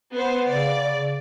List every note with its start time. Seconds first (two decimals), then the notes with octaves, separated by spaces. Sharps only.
0.14 B3 C5
0.48 C#3 D5